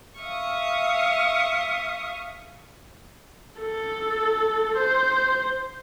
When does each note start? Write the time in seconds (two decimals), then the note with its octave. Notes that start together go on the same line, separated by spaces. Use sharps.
0.20 E5 F5 C#6 D#6
3.60 A4
4.77 C5